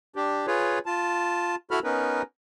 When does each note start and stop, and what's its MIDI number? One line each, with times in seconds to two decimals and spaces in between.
0.16 0.46 62
0.16 0.46 67
0.47 0.79 65
0.47 0.79 68
0.47 0.79 71
0.47 0.79 73
0.86 1.55 65
0.86 1.55 81
1.71 1.79 64
1.71 1.79 66
1.71 1.79 69
1.71 1.79 83
1.71 1.79 89
1.84 2.22 59
1.84 2.22 61
1.84 2.22 63
1.84 2.22 70
1.84 2.22 71